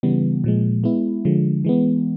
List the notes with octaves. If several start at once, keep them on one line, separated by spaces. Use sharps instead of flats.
C#3 E3 G3 B3
A#2 F3 G#3
G#3 B3 E4
D3 F3 G#3
E3 G#3 B3